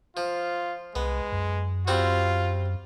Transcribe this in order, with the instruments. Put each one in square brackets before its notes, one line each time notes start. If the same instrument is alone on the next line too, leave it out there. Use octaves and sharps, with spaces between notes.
[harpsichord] F3 [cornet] F4
[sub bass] C2 [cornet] G#3 [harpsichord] B3
[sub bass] F#2
[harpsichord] G3 C4 F#4 [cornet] F4